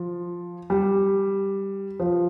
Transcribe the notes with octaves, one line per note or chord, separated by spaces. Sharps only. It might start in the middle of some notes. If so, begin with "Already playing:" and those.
Already playing: F3
G3
F3